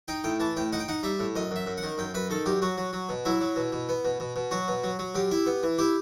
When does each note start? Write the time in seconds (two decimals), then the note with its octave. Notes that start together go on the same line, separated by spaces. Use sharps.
0.08 D#4 G5
0.24 A2 G5
0.40 E3 A5
0.57 A2 G5
0.73 D#4 F#5
0.80 G5
0.88 D#4 F#5
1.03 G3 E5
1.20 A2
1.35 F#2 D#5
1.51 F#2 E5
1.67 F#2
1.78 F#5
1.83 D#3
1.98 F#2 G5
2.14 F#2 B4
2.30 D#3 A4
2.46 F#2 G4
2.62 F#3 F#4
2.78 F#3
2.93 F#3
3.09 B2
3.25 F#3 E4
3.41 F#3
3.56 B2
3.72 B2
3.89 B3
4.05 B2
4.20 B2
4.36 B2
4.51 F#3 F#4
4.68 B2
4.84 F#3
4.99 F#3
5.15 F#2 G4
5.31 E4
5.46 B3
5.63 E3
5.78 E4 G4